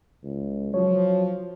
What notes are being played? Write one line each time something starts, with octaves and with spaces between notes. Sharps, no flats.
C#2
F3 F#3 C#5